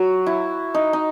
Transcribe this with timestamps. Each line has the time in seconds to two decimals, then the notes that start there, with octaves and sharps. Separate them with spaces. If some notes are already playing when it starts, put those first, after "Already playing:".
Already playing: F#3 F#4
0.26 E4
0.74 D#4
0.93 D#4